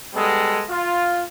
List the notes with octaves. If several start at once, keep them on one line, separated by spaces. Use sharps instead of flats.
G3 G#3 B3 A4
F4